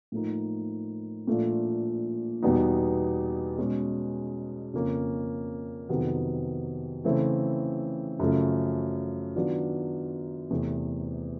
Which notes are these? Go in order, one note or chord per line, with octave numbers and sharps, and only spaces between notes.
A2 F3 A#3 D#4
A#2 F3 A3 D4 F4
E2 B2 G3 B3 D#4
B2 G#3 C#4
F2 C#3 F3 A#3 C#4
F2 C3 D#3 F#3 B3
C#3 E3 A3 C4 E4
F#2 C#3 F3 A3
D#3 F#3 B3 D4 F4
E2 C3 E3 A3